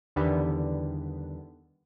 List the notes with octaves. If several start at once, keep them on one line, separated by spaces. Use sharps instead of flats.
E2 D3 D#3 G3 B3